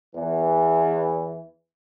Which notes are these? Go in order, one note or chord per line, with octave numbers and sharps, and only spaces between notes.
E2 E3